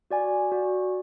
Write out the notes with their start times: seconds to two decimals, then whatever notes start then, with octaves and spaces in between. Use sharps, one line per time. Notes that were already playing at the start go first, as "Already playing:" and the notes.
0.11 F#4 D5 G#5
0.52 F#4 D5 G#5